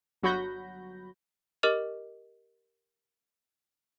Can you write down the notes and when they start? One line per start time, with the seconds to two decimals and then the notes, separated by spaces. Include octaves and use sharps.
0.22 G1 F#3 F#4 B5 G6 A#6
1.63 G4 A#4 D#5 D6 F6 F7